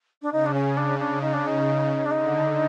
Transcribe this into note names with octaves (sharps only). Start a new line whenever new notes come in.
D4
C#3 D#4
D4
C#4
D4
D4
D#4
D4
D#4
D4
D3 D#4